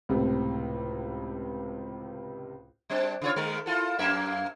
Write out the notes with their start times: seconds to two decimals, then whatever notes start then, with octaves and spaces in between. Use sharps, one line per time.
0.09 C#2 A2 C3
2.90 G3 C4 D4
3.22 C#3 F4 C#5
3.36 D#3 G#3 A#4
3.66 E4 F4 A4
3.99 F#2 A#3 E5